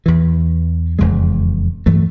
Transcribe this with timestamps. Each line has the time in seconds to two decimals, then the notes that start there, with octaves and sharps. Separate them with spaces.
0.06 E2 E3
0.99 E1 F2 C#3 G#3
1.86 G2 E3 F#3 A3